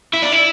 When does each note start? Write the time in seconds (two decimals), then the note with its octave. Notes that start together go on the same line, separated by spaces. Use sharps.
0.14 E4
0.23 D4
0.32 E4